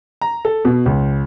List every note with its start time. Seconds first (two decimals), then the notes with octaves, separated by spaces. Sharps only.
0.21 A#5
0.45 A4
0.65 B2
0.86 C#2